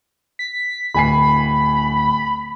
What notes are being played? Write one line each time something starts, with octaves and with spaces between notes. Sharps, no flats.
B6
D1 G#5 B5 C7